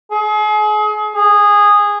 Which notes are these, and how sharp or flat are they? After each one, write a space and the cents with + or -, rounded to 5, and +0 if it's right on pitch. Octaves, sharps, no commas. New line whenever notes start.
G#4 +35
G#4 -15